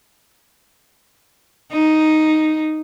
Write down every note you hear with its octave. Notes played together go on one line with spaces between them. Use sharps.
D#4